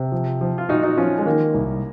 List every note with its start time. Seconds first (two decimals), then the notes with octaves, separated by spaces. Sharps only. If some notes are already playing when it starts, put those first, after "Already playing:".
Already playing: C3
0.12 F3
0.41 F3
0.58 F4
0.69 A#2 D#4 F#4
0.83 D#4 F#4
0.97 F3 C#4 F4
1.18 G#3
1.26 D#3 A#3
1.54 C2